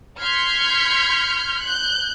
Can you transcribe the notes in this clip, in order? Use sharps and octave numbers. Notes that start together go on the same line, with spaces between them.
C6 F6 G6 G#6 B6 C#7
F#6 G6